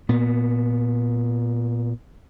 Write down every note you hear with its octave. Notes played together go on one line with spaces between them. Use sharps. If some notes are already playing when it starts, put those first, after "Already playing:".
A#2 B3